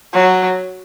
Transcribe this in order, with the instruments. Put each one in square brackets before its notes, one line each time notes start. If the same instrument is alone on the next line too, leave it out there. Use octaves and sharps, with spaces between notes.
[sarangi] F#3